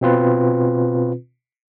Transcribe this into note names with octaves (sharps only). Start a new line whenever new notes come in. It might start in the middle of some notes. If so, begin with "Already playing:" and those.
B2 C4 F4 B4